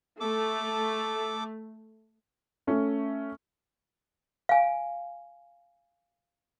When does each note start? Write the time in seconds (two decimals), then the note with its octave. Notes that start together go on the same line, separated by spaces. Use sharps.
0.21 A3 A4 D6
2.67 A3 C#4
4.49 F5 G#5